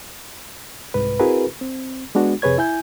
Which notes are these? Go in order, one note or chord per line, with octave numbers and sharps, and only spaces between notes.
C2 G#2 B4
C4 E4 F#4 G#4 A#4 B4
C4
G#3 B3 D4 F#4
F2 C3 G#4 B4 C#5 G#6
E4 G#5 G6